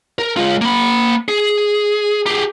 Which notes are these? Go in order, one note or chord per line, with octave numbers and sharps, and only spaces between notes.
A#4
G#3 F4
A#3 B5
G#4
G4 G#4